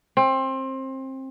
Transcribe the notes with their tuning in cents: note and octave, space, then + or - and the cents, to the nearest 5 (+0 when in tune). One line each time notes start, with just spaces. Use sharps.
C4 +25